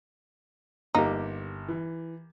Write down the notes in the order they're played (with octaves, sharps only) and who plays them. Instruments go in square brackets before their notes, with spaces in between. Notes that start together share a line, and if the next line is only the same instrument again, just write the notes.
[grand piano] G1 [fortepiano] A#3 G4 [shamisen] D#4
[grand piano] E3